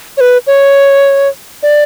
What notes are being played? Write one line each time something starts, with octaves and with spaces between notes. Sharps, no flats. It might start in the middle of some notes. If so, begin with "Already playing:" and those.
C#5
B4
C#5
D5